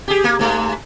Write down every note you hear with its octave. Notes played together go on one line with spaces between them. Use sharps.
G4 G#4
A#3
G#2 A3